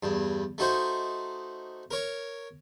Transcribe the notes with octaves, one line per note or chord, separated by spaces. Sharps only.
E2 G2
A3 D#4 F#4 C5
A#4 C#5